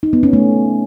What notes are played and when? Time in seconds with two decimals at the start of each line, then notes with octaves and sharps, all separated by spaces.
0.03 D#4
0.13 B3
0.23 C#4
0.33 A3